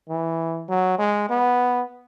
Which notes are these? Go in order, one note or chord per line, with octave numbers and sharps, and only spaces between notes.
E3
F#3
G#3
B3